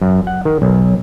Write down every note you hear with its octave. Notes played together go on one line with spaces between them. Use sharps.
F#2
F#5
D#3
B1